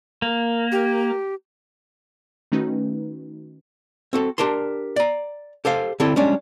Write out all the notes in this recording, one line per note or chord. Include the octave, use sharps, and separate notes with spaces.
A#3
G4
D#3 A3 C#4 D#4 F#4 B4
C4 F#4 A4
D4 G4 A#4 A5 C6
D5 A#5
G4 A4 C5 F5
D3 C4 E4 G4 A4
G3 G#3 C#4 D4